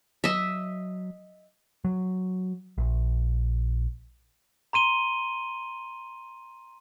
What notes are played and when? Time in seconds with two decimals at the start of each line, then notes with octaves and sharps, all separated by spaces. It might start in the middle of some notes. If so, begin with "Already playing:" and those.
0.24 F#3 D#5 E5
1.85 F#3
2.78 A#1
4.73 A#5 C6 D#7 G7